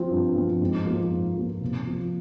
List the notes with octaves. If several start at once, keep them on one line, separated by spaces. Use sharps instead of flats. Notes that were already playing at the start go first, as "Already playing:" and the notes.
Already playing: F3 C4 F4
G2
F3 C4 F4
G#2
F3 A#3
G#2
F3 A#3
C3
F3 A#3